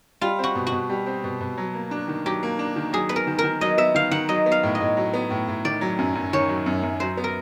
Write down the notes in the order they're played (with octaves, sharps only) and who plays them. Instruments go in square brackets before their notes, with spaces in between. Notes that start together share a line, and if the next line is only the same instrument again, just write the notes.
[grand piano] G3 [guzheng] F4
[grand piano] C4 [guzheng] F#4
[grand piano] B2
[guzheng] F#4
[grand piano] B2
G3
C4
B2
B2
F#3
A#3
D4
D#3
[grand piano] F#3 [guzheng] G4
[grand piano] A#3
D4
D#3
[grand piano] F#3 [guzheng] G#4
[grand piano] B3 [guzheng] B4
[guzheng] A#4
[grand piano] D#3
[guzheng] A#4
[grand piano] D#3
[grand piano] F#3 [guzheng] D#5
[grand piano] B3 [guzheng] E5
[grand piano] D#3 [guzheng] F5
[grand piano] D#3 [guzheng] F#5
[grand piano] F#3 [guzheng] D#5
[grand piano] B3
[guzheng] F5
[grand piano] A2
[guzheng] D#5
[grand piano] A2
F#3
B3
A2
A2
[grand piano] D#3 [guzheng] D5
[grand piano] F#3
F#2
F#2
[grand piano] D#3 [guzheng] C#5
[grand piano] F#3
F#2
F#2
[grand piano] F#3 [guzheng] C5
[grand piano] B3
[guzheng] A#4